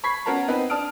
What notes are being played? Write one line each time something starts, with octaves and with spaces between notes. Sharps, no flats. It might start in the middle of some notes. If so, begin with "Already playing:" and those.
B5 C#6 G#6 B6 C7
B3 C#4 F#4 A#4 A5 A#5
B3 C4 D#4 B4
D4 A5 D#6 F6 D7